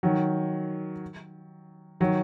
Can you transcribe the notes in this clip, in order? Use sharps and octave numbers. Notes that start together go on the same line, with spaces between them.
D#3 F#3
D#3 F#3